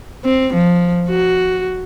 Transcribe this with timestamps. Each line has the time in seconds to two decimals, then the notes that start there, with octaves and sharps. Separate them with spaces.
0.25 C4
0.53 F3
1.10 F#4